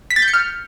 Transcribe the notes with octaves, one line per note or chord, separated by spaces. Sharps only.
B6
A6
G6
C#7
F6